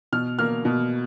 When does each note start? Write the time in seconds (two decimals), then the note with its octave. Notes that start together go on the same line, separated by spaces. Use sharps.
0.12 B2 F6
0.39 A#3 F6
0.65 B2